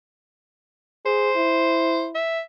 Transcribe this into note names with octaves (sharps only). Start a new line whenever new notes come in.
G#4 C5
E4
E5